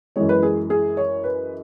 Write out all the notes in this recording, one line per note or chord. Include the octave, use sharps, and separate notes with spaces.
F#2 E3 G#3 C#5
B4
G#4
G#4
C#5
B4